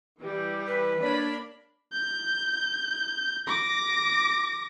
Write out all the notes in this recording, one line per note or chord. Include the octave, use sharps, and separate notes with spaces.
E3 G3 G4
B4
A#3 D4 A#4 C#5 D5 B5
G6
D6 A#6